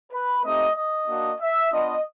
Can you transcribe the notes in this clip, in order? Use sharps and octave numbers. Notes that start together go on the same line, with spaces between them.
B4
A3 C4 D#4 G4 D#5
D#5
A#3 D4 F#4
E5
B3 D4 F4 D#5